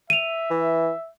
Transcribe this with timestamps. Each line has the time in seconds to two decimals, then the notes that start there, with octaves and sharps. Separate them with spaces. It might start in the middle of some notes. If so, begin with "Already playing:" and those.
0.10 E5 D#7 F7
0.51 E3